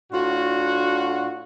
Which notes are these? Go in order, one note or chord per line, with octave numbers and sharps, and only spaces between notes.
A2 D4 F4 F#4